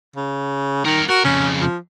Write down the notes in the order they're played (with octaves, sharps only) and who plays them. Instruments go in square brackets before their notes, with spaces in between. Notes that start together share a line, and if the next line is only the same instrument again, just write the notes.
[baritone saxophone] C#3
[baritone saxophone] D#3 [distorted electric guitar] A#4 F#5
[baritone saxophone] F#4 [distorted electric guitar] A#4
[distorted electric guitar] F2 C#3 [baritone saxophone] C#4
[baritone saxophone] F3